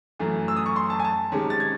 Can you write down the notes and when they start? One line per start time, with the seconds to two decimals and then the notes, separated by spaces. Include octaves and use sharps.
0.19 F#2 E3 A3
0.48 E6
0.56 D#6
0.66 C#6
0.76 C6
0.90 A5
1.00 G#5
1.05 A5
1.32 C3 D#3 G#3 C#4
1.50 A6
1.60 G#6